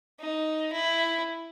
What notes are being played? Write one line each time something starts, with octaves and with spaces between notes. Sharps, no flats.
D#4
E4